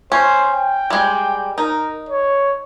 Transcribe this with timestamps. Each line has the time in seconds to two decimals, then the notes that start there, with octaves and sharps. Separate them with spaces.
0.12 C#4 C5
0.54 G5
0.90 G3 G#3
1.58 D#4 A#4
2.09 C#5